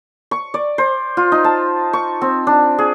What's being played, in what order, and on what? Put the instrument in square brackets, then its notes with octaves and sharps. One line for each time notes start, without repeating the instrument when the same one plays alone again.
[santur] C#6
D5
C5
F4
D#4
A5
C#6
C4
D4
G#4